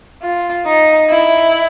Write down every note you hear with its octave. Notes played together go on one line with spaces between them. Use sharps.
F4
D#4
E4